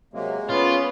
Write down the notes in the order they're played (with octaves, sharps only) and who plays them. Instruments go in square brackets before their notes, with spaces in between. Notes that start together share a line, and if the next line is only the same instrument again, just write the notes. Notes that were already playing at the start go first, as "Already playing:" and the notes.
[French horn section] C3 F#3 [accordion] G#3 A#3
[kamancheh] B3 [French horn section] C#4 C#5 [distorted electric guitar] F4